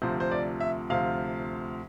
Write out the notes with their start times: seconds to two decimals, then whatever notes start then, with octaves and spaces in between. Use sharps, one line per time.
0.02 D2 C3 F3 C5
0.20 C5
0.31 D5
0.60 E5
0.90 D2 C3 F3 F5